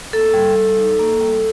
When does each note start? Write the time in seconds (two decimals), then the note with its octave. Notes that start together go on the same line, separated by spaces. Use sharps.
0.13 A#3 A4
0.34 G3
0.56 G3
0.77 D#4
0.99 A#3
1.20 G3